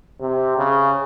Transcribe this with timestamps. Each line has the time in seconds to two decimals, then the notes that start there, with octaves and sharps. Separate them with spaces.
0.20 C3
0.57 C#3